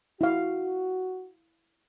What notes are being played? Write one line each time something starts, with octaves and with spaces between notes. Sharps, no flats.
E4 F#4 F5